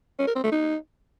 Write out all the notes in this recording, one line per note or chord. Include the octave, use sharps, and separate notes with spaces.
C#4
A#4
C4
A3
D#4